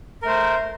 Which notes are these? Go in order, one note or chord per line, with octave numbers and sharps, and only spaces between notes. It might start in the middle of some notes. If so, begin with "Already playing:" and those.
A3 A#4 C5